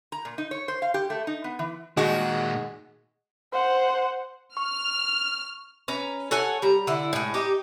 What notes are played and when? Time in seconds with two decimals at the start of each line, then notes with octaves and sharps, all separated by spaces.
0.12 A#5
0.25 A#2
0.38 D#4
0.51 C#5
0.68 C5
0.82 F5
0.94 G4
1.10 A3
1.27 D#4
1.44 B3
1.59 E3
1.97 A#2 D#3 G#3 F#4
3.53 C5 F#5
4.57 C#6 F6
5.88 C#4 B4 A#5
6.31 A4 C#5 F#5 G#5
6.62 G3 A#5
6.87 D3 E4
7.13 A2 G#3
7.34 D#4 G4